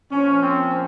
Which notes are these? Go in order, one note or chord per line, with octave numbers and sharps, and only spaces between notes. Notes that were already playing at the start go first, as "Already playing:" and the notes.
A#2 F3 C#4
C4